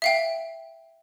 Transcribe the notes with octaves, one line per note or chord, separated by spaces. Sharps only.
E5 F5 G5